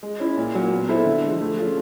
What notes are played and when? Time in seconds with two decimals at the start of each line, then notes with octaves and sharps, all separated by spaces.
0.03 G#3
0.20 C#4 E4
0.37 A#2
0.55 F#3 A#3
0.72 B3
0.89 E4 A4 C5 E5
1.05 D3
1.23 G#3
1.28 F3
1.41 A3
1.57 C#4 F4 G#4